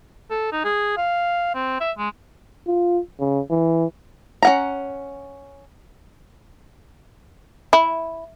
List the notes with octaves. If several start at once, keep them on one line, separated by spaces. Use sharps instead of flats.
A4
D#4
G#4
F5
C4
E5
G#3
F4
C#3
E3
C#4 F#5 A#5
E4